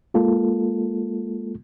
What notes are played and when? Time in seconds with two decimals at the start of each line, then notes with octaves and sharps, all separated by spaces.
0.14 G#3 A#3 F4 A4